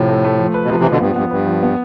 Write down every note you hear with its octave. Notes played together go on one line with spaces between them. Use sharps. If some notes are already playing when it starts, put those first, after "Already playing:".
Already playing: A2 C3 F3
A3
A3
F3
B4
B2
C3 F3
C3 E3
F3
B2 D3
G2 B3
G2 B3
G2 B4
F3
B3